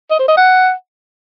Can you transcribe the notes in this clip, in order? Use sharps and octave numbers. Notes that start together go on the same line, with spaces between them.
D#5
C5
D#5
F#5